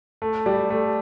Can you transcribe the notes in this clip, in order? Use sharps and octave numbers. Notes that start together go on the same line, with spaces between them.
A3
G3
A3